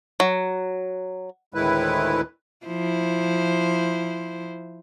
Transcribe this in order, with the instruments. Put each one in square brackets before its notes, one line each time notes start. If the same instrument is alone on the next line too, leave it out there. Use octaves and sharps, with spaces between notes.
[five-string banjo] F#3
[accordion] D2 A2 D#3 G#3 E4 B4
[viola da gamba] F3 E4 C5